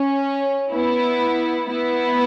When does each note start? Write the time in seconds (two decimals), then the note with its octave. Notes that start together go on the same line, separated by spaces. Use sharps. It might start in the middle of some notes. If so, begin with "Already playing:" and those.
Already playing: C#4
0.72 B3 E4
1.70 B3 E4